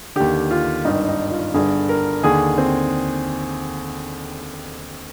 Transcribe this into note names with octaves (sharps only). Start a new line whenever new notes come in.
D#2 D3 G4
F4
G#1 G2 D#3 D#4
D#4
F4
G1 G2 D3 G#4
A#4
D#2 D3 G#4
C4